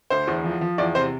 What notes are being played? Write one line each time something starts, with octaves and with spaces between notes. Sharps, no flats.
D2 C5
E2
F3
F3
E2 D5
C3 C5